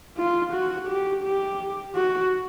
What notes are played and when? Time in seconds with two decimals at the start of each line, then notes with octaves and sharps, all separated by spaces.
0.17 F4
0.53 F#4
0.88 G4
1.24 G4
1.96 F#4